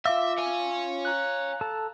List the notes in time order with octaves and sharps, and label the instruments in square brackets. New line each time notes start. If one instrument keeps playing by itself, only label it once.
[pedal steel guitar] F4 D6 E6 [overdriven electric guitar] E5 [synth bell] F5
[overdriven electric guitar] C#5 G#5
[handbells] A#5 F#6
[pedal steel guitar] A4 A5